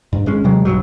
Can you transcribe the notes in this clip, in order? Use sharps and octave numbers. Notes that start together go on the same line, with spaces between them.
G2
G#1 G#3 C#4
D#2 C3 F#3 G#3
B1 G2 B2 F#3